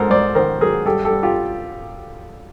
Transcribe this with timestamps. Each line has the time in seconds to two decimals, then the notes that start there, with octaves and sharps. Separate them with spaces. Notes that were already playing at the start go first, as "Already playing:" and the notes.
Already playing: G#2 A4 A#4 C5
0.10 G#2 C5 D5
0.35 D#3 A#4 C5
0.61 F#3 G#4 A#4
0.85 G2 G4 A4
1.05 G4 A4
1.10 G2
1.23 F4 G4